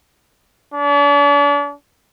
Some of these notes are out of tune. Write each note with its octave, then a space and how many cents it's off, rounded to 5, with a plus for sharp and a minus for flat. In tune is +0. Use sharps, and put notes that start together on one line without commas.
D4 -40